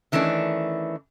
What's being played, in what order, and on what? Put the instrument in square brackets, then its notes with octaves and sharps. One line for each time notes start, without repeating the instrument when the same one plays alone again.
[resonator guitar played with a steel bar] D#3 E3 A3 C#4 D4